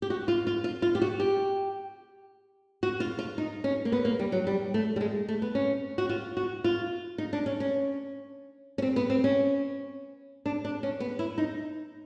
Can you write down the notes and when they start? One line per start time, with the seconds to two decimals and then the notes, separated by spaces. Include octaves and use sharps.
0.02 G4
0.10 F#4
0.28 F4
0.47 F4
0.64 F4
0.82 F4
0.95 G4
1.02 F#4
1.20 G4
2.83 F#4
3.00 F4
3.19 F4
3.38 D#4
3.64 C#4
3.85 A#3
3.92 B3
4.05 A#3
4.19 G3
4.32 F#3
4.47 G3
4.74 A3
4.96 G3
5.01 G#3
5.28 A3
5.42 B3
5.55 C#4
5.98 F#4
6.09 F4
6.37 F#4
6.64 F4
7.18 D#4
7.33 D4
7.46 C#4
7.60 C#4
8.78 C#4
8.82 C4
8.96 B3
9.10 C4
9.24 C#4
10.46 D4
10.65 D4
10.83 C#4
11.00 B3
11.19 E4
11.38 D#4